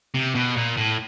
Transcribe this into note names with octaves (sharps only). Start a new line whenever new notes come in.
C3
B2
A#2
A2